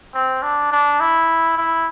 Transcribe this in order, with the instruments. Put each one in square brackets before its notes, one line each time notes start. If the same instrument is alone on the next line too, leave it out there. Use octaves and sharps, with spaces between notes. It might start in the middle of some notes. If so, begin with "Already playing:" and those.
[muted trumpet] C4
D4
D4
E4
E4